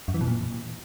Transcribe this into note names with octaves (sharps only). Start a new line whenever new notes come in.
F#2
E3
B2
A#2